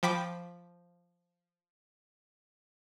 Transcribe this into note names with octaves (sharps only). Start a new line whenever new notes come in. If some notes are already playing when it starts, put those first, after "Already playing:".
F3 G5 B5 D6